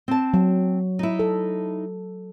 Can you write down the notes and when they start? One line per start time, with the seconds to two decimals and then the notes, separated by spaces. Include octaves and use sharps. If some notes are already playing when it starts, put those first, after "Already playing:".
0.08 C4 A5
0.34 F#3
0.99 D#4 E4
1.19 A4